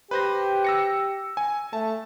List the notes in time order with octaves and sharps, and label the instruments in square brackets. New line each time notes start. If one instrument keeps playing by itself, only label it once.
[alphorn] G4 [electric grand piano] B4 C5 A#6
[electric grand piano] E6 A#6 C#7
G#5
[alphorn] A3 [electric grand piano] A5